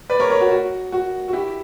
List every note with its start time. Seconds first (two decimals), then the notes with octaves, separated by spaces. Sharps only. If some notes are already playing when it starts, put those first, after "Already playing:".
0.10 B4 D5
0.20 A#4 C#5
0.30 A#4 C#5
0.41 F#4
0.51 F#4
0.92 F#4
1.28 F#4
1.33 E4 G4